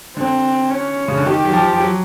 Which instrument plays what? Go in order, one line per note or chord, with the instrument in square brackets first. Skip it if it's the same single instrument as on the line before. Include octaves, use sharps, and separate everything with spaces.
[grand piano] D3 [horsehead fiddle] C4
[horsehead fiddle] C#4
[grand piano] C#3
D3
[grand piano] D#3 [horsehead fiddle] G4
[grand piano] F#3
F3
F3
F#3